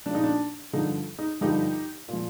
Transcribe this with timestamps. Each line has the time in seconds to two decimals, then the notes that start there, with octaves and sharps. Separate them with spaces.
0.06 F3 D4
0.10 A#2 D#4
0.24 D4
0.73 G2 D3 F3 D#4
1.19 D#4
1.41 G2 D3 F3 D#4 G4
2.08 A#2 F3